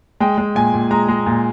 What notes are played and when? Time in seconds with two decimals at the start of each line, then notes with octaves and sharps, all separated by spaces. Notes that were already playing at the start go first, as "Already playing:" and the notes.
0.20 G#3 G5
0.38 G#3
0.55 A#2 G#5
0.73 A#2
0.91 G#3 A#5
1.08 G#3
1.26 A#2